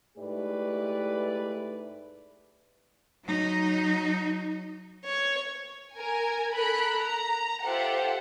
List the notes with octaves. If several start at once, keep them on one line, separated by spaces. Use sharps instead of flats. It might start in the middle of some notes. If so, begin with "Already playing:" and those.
G#2 A3 E4 G4 B4 D5
F#3 D#4
C#5
A#4 G#5
A4 A#4 B5 F#6
A#5
F4 G4 A4 C5 E5 F#5